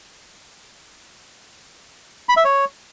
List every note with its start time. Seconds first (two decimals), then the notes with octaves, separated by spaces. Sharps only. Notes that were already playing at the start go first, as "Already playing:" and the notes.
2.29 B5
2.37 E5
2.45 C#5